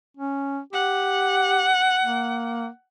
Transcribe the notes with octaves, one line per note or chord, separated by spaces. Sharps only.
C#4
G4 F#5
A#3